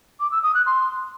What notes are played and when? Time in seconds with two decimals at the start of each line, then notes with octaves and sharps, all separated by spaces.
0.20 D6
0.32 E6
0.43 D#6
0.55 F#6
0.66 C6